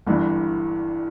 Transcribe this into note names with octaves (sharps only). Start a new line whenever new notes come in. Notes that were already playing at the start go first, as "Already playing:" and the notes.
G1 G2 E3 E4